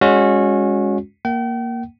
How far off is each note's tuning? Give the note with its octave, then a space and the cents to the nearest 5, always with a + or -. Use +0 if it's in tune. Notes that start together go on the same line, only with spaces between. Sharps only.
G#3 -20 C#4 +0 F#4 -25
A#3 +0 G5 -40